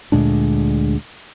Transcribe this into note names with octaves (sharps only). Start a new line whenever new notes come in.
D2 A#2 G#3 D4